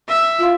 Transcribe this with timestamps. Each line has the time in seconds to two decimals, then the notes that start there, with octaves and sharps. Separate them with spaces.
0.09 E5
0.39 F4